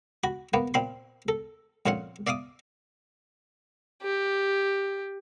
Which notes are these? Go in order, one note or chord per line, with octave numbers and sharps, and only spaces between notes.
F#4 B5
A#3 B3 B4
A#2 C4 B5 C6
A4
F2 A#2 C#4 F4 F5 F#5
D5 E5 F5 D6 D#6
G4